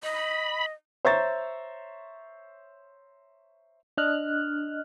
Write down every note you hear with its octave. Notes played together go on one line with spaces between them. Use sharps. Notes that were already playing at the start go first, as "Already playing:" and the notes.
D#5 B5
C5 C#5 E5 A#5 C#6 A6
D4 D#5 F6 F#6